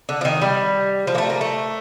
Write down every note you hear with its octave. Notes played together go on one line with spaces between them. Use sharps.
D3
F3
D#3
G3
F3
A#3
A3
A#3
A3